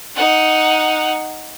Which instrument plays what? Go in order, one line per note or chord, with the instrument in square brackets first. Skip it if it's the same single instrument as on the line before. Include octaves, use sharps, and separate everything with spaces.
[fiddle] D#4 F#5